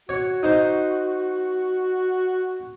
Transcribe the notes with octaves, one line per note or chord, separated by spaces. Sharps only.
F#4 C#5
D#4 C5